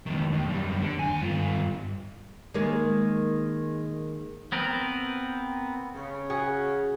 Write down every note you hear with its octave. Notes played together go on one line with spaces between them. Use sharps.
C#2 D#3
D#2
F#2 G3
D3
D#2 G#5
G2 F4
D#3 G#3 A#3
B3 C4 A#4 B4
C#3
F#4 G#4 F#5